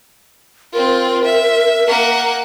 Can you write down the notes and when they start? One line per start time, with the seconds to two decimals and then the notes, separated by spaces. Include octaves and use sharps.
0.73 C4 F4 A#4
1.25 E5
1.88 A#3 F#5